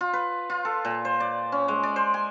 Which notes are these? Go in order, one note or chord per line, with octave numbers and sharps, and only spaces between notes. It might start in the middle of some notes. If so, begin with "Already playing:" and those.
F4
B4
F4
A4
A#2
C5
D5
C#4
G#3
D5
C5
G#5